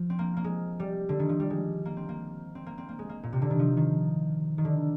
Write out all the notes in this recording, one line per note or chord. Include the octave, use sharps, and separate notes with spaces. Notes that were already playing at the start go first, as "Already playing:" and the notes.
Already playing: F3
C4
A#3
A#3
G#3
G3
D3
D#3
F3
G3
G#3
A#3
C4
A#3
C4
A#3
C4
A#3
G#3
A#3
A#2
C3
D3
D#3
F3
D#3
D#3
D3